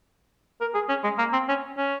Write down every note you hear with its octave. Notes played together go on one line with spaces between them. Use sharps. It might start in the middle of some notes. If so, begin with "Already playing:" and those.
A#4
G#4
C#4
G#3
A#3
C4
C#4
C#4